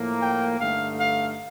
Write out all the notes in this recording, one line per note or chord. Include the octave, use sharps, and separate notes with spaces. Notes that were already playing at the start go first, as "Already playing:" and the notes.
Already playing: A2 F3 A#3
G5
G2 D3 A3 D#4 F5
F5